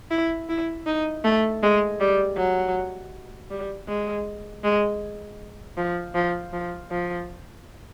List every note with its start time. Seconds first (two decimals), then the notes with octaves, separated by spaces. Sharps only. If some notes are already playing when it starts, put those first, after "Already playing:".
0.11 E4
0.49 E4
0.86 D#4
1.24 A3
1.62 G#3
2.00 G3
2.37 F#3
3.50 G3
3.88 G#3
4.64 G#3
5.77 F3
6.15 F3
6.53 F3
6.91 F3